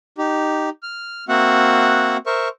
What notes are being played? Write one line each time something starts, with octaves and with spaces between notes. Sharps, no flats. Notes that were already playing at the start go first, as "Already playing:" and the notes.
D#4 G4
F6
A#3 C4 F#4 E5 F#5
A#4 C5 E5 C#6